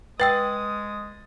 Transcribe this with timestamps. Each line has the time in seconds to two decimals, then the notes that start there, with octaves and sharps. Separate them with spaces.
0.20 G#3 B4 G5 D#6 E6 A6